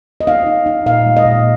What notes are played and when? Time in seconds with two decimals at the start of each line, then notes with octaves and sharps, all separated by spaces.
0.21 D#5
0.27 D#4 F5
0.47 D#4
0.66 D#4
0.86 A#2 F5
1.06 G#3
1.17 D#5
1.26 A#2